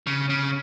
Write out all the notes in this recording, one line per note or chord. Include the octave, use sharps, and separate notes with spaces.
C#3
C#3